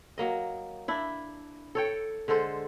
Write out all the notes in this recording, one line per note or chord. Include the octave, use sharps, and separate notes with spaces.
F#3 A#3 D#5
D4 E4
A4 C#5 G5
D3 G#3 A4 C5